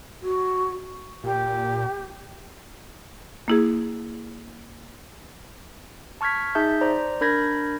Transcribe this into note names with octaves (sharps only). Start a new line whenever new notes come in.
F#4
A#2 G4
A#3 E4 G#4
A5 C#6 F6 G#6 B6
D#4 G#4 E5 A5 G6
C5 D5 A#5
D4 A#4 B5 G6 G#6 A#6